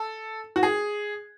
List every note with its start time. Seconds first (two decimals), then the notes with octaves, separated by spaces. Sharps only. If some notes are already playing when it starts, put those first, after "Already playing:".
Already playing: A4
0.56 F#4
0.63 G#4